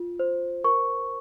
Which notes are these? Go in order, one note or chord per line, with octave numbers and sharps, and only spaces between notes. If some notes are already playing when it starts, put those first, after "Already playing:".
Already playing: F4
C5
A#4 C#6